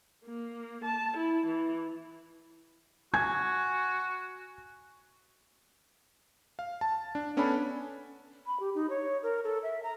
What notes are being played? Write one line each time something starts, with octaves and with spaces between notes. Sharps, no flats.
A#3
A5
E4
E3
F#4 G#5 G#6
F5
A5
D4
B3 C#4 D4 A4 G#5 B5
B5
G4
D#4
C#5
A#4
A4
E5
A#5